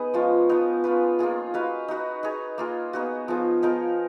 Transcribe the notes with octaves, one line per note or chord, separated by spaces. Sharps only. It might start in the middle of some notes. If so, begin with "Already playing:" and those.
Already playing: B3 D#4 G#4 B4 D#5
F3 G#3 C#4 F4
F3 B3 D#4
C#4 F4 B4
A#3 F4 G#4
D#4 F#4 B4 F5
D#4 F#4 B4
D#4 G#4 C#5
A#3 F4 G#4
B3 D#4 F#4
F3 B3 F4 G#4
F3 B3 D#4 A#4